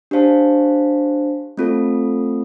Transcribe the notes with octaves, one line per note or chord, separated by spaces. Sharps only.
D4 G4 C5 F5 A5
A3 C4 F4 A4